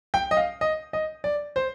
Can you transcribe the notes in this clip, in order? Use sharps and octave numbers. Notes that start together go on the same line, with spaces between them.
G5
D#5
F5
D#5
D#5
D5
C5